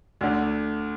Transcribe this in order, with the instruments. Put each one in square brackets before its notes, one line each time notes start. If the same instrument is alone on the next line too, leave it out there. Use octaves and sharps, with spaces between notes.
[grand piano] D2 D3